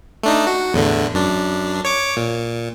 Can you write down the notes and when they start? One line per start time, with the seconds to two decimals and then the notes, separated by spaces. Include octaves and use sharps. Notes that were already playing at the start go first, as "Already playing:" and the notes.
0.23 A3 D4 D#4
0.47 F#4
0.74 E2 A2 D3
1.14 F#2 D4
1.85 C#5 D6
2.17 A#2